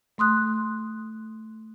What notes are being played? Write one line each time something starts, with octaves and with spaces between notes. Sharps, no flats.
A3 C6 D#6 F#6